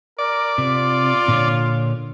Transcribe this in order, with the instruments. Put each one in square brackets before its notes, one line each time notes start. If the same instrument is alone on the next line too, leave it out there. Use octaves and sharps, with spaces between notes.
[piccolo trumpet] A#4 [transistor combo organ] D5
[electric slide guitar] C3 [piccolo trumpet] F4
[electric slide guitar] A#2 D3 C#5